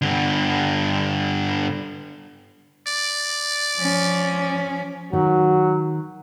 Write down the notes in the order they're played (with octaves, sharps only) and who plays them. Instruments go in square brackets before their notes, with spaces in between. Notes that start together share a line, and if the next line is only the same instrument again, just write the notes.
[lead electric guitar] G2 D3
[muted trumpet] D5
[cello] F3 C#4
[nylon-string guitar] D#3 [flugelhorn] F#3